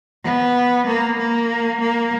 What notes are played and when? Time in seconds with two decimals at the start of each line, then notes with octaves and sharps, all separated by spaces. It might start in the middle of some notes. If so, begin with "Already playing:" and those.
0.24 B3
0.87 A#3
1.18 A#3
1.81 A#3